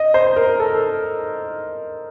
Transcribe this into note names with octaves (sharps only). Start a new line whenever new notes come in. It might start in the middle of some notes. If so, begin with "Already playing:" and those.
Already playing: D#5
C5
A#4
A4